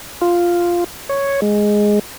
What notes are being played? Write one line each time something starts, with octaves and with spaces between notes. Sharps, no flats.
F4
C#5
G#3